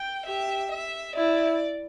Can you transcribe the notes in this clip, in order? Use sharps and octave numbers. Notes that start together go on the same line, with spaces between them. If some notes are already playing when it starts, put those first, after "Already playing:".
Already playing: G5
G4 E5
E5
E4 D5